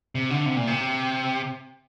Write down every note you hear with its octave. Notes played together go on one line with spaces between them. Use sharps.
C3
D3
C3
A#2
C3